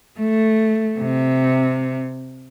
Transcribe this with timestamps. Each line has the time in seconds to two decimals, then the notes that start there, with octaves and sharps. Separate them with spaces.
0.17 A3
0.98 C3